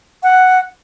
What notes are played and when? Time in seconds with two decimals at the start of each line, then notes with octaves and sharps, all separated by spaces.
0.23 F#5